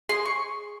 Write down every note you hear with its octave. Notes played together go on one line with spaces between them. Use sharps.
G#4 C6
C#6